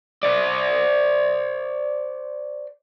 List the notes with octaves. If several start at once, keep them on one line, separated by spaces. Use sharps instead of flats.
C5 D5